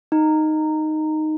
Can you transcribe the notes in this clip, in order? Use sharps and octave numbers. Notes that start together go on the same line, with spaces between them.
D#4